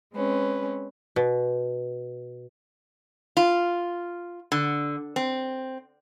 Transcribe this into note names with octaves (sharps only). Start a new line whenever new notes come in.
G#3 C4 C#4 B4
B2
F4
D3
C4